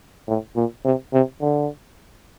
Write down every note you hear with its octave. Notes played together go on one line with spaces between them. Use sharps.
A2
A#2
C3
C3
D3